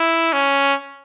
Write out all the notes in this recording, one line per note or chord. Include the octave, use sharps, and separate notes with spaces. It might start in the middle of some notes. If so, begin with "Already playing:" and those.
Already playing: E4
C#4